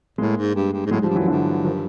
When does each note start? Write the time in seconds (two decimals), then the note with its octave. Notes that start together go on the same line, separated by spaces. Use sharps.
0.18 A2 G#3 A#3
0.37 G#2
0.55 G2
0.73 G2
0.86 G#2
0.91 A2 F#3 G#3
1.00 G#2 F3 G3
1.09 G2
1.15 E3 F#3
1.19 F#2
1.28 G2 D3 E3
1.64 D#3 F3